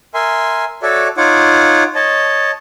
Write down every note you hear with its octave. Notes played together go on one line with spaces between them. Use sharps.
A#4 E5 G#5 C6
F#4 A4 C#5 D5 E5
D#4 F4 C#5 F#5 D6
C#5 D#5 A5